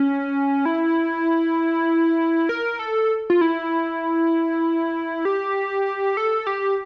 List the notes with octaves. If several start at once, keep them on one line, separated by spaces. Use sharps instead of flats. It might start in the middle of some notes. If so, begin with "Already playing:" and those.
Already playing: C#4
E4
A#4
A4
F4
E4
G4
A4
G4